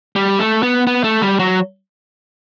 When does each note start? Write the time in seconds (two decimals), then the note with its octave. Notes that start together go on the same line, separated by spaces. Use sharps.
0.16 G3
0.39 A3
0.63 B3
0.87 B3
1.04 A3
1.22 G3
1.39 F#3